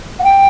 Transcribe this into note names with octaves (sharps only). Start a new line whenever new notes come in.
F#5
G5